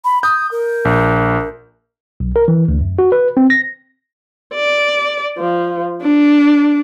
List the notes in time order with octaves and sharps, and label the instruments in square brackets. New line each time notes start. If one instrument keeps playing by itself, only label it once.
[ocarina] B5
[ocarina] D#6 [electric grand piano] G6
[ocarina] A#4
[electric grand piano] A#1
[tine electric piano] B1
A#4
E3
D2
F#2
F#4
B4
C4
A#6
[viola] D5
F3
D4